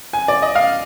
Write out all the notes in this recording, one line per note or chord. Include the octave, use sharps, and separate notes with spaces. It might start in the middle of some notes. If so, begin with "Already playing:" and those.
G#5
D5
D#5
F5